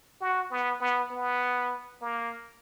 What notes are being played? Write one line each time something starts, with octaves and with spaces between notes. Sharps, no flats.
F#4
B3
B3
B3
A#3